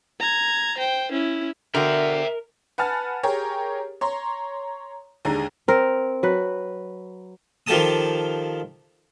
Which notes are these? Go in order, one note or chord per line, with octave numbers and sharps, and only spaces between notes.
A#5 G#6
C5 G5
C#4 E4
D3 F#4 A#4 E5 G5
B4 F#5 G#5 A5 F6 A6
G4 G#4 A#4 C#5
C#5 A#5 C6
D#2 D3 G#3 A#5
C4 A#4
F#3 B4
D#3 F3 G4 A4 A5 D#6